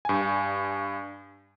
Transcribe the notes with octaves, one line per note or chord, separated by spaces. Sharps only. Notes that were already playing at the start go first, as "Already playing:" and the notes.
G2 G#5